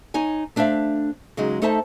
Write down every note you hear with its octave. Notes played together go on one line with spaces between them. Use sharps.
D#4 C#5 G#5
A3 D4 C5 E5 F5
C#3 F#3 G#3 D#4
A3 D#4 A4 C5 E5 A5